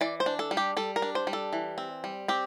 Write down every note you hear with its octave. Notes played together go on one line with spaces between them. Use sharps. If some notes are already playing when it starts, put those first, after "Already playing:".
E3 D5
C5
D4
A4
G3
G4
G3 A4
A#4
D4
C5
G3
A4
E3
C4
G3
C4 G4